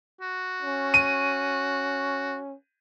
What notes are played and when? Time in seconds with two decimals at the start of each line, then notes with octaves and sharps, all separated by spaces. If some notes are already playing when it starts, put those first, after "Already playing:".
0.21 F#4
0.62 C#4
0.94 D#7